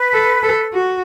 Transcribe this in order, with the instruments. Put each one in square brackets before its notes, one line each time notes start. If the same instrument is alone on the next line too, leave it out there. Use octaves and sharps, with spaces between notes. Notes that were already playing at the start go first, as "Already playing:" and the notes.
Already playing: [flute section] B4
[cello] A4
A4
F#4